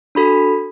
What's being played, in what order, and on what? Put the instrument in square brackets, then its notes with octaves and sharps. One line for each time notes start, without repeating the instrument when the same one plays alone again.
[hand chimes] D4 F#4 A4 B5